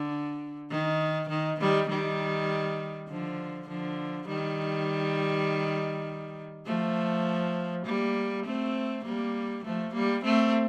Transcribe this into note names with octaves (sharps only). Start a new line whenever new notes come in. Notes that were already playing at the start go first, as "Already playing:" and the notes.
Already playing: D3
D#3
D#3
D#3 G3
D#3 G3
D3 F3
D3 F3
D#3 G3
F3 A3
G3 A#3
A3 C4
G3 A#3
F3 A3
G3 A#3
A3 C4